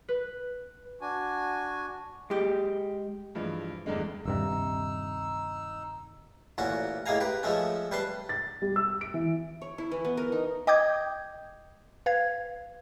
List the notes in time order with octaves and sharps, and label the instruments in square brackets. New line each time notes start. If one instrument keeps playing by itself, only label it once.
[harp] B4
[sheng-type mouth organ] D4 F#4 G#5
[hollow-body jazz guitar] G#3 G4
[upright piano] G2 E3 F3 G#3
E2 G2 D3 G3 G#3
[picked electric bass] D#1 G2 C3 [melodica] D#4 E6
[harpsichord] A1 A#2 C#4 F#4
A2 G#3 A#3 F5 G#5 A#5
G4 B4
F3 G#3 A3 C#4
G3 B4 A5 C6
[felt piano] A6
G3
E6
D7
E3
[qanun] C#5
E4
E3
B3
A#4
D#4
[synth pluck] D#5 G5 D6 D#6 G6 G#6
B4 F5 G#6